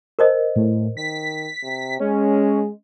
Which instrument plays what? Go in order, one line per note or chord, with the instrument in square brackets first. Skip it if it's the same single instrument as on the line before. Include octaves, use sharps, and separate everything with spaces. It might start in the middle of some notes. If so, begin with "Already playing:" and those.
[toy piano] A#4 C5 D#5
[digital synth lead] A2
[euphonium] D#3 [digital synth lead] B6
[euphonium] C3
[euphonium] G#3 [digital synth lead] C#4